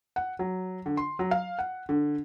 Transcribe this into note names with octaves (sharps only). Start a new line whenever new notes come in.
F#5
F#3
D3
C6
F#3
F5
F#5
D3